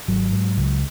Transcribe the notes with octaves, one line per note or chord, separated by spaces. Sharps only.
G#1 F#3
G#2
C#2